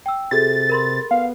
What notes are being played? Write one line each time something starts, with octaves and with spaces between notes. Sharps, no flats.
G5 E6
C3 F#4 G#4 A4 A6
A#4 B5 C6
B3 F5